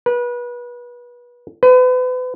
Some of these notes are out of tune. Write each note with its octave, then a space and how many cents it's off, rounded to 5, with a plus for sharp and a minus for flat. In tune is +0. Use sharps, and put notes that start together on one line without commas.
B4 -30
B4 +35